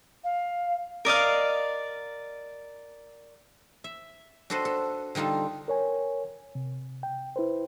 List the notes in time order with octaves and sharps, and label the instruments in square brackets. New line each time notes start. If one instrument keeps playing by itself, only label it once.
[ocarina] F5
[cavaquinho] A#4 D5 D#5 F5
[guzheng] E5
D4 F#4 A4 B4 C5 D#5
A4
D3 G3 D#4 F4 A4
[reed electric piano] A#4 C#5 G#5
C3
G5
E4 B4 C5